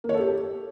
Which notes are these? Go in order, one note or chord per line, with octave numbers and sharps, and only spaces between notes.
A#3
C#5
A4
G4